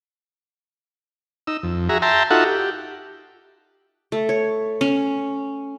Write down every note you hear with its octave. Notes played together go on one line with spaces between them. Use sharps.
D#4 E6
F2
F#4 G#4 E5 A#5
E5 G5 A5 A#5 C6
D#4 F4 F#4 A4 E5 F#5
G4
A3
C#5
C#4